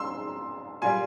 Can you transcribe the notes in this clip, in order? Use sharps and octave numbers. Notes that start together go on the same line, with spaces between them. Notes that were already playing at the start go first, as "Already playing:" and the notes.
Already playing: C6 E6
A#2 G3 G#5 C6